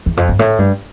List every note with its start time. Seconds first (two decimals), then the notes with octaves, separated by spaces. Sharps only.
0.06 E2
0.17 F2
0.29 G2
0.39 A2
0.59 G2